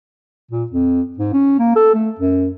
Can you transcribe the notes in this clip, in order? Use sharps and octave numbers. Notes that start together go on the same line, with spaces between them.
A#2
F2
G#2
C#4
A#3
A4
A3
F#2